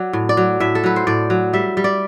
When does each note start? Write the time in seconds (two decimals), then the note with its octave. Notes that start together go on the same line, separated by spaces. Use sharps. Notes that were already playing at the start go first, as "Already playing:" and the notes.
Already playing: F#3 D5
0.13 A2
0.29 D5
0.37 F#3
0.60 A2 E5
0.75 A4
0.84 F#3 B4
0.96 C5
1.07 A2 D5
1.30 F#3
1.53 G3 E5
1.77 G3
1.84 D5